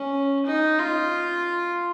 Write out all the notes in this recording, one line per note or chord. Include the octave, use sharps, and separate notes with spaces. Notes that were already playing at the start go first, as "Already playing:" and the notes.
Already playing: C#4
D#4
F4